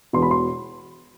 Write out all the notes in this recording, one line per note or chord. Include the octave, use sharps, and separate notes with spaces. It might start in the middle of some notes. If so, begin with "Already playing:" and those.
E1 E2 B2 C6
B5
C6